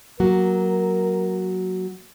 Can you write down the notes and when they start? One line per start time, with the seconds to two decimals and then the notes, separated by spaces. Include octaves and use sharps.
0.20 F#3 A#3 F#4 A#4